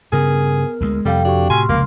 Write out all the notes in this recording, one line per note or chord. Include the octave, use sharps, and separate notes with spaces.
G2 C#3 B3 G#4 A#4 F6
D2 E3 G#3
F2 C3 G3 A4 F5 G5
D4 F#4 G4 C#6
A2 C3 G#5 C6 F6
F1 C#2 C#3 A#3